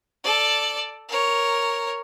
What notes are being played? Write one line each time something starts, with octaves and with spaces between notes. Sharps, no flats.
A4 D5
A#4 C#5